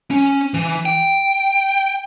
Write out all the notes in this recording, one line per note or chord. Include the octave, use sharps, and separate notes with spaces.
C#4
E3
G5